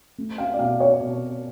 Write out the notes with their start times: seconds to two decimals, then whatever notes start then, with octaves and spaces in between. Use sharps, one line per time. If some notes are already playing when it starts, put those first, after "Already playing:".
0.18 A3
0.38 F5
0.54 D5
0.59 B2 F5
0.80 C#5
1.00 B2